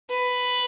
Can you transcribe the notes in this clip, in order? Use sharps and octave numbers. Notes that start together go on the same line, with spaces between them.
B4